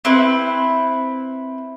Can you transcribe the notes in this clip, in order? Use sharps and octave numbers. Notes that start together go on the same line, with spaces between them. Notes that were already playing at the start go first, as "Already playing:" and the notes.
C4 E4 B4